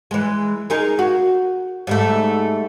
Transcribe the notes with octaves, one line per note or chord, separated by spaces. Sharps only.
E3 G#3
D#4 G#4 A#4
F#4
G#2 G3 A3